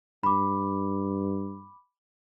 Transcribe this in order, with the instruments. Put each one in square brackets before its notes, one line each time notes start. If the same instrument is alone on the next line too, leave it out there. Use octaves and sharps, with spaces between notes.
[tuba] G2 [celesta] B5 D6